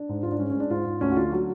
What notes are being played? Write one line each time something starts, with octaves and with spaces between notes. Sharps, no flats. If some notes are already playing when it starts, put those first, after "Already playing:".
Already playing: D4
G#2
G#2 F4
D4
G#3 C#4
C#4
G#3
D4
G#2 F4
G#2
D2 C#4
F#4
D3 F4
F#3 F#4